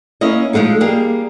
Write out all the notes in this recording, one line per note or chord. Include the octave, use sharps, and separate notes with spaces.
A#3 C#4 E4 D#5
F3 F#3 G#3 A3 D#4
G3 A#3 G4 G#4